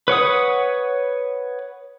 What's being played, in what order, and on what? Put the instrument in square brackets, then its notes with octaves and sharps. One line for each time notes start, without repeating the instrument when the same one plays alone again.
[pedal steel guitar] B4 C#5 F#5 D#6